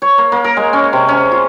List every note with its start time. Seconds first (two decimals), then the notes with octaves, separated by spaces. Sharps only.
0.02 C#5
0.18 A#3
0.32 A#3
0.44 A#4
0.57 G#3
0.73 C#4
0.93 C3
1.08 C#4
1.32 F4